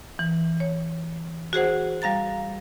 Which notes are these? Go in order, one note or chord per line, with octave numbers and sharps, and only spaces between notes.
E3
C#5
F#4 G#4 C5 F#5
G3 F5 A#5 A6